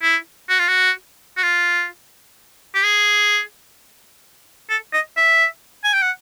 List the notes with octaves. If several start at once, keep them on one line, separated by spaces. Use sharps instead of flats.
E4
F#4
F4
F#4
F#4
F4
G4
G#4
A4
D#5
E5
G#5
G5
F#5